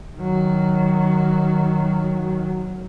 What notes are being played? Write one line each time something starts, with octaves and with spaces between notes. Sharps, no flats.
D#3 F#3